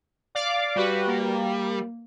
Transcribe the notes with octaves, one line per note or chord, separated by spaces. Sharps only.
D5 F5 D6
G3 F#4 B4
A#3